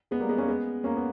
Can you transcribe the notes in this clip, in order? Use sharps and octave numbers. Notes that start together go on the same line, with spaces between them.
G#3 B3
G3 A#3
G#3 B3
A#3 C#4
G#3 B3
A#3 C#4
B3